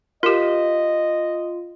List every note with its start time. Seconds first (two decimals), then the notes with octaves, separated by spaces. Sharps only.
0.23 F4 G4 A#4 D#5